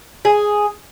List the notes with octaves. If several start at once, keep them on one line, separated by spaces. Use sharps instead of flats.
G#4